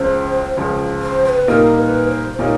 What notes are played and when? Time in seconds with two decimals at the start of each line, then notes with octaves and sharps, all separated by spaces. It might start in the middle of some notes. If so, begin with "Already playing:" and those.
Already playing: C#2 C#3 F3 C5
0.57 C#2 C#3 F3
1.02 C5
1.25 C5
1.29 B4
1.48 A#2 G3 A#3 D#4 A#4
1.78 B4
2.08 C5
2.38 A#2 G3 A#3 D#4 C#5